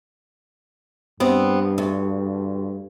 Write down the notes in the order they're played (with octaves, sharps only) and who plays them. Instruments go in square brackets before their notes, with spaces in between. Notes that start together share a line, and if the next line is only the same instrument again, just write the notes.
[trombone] G2 [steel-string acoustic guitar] B3 C4
[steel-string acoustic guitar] D2